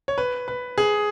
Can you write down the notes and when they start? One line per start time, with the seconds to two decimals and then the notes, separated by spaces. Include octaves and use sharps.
0.08 C#5
0.18 B4
0.48 B4
0.78 G#4